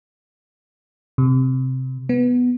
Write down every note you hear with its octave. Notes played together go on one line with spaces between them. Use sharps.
C3
B3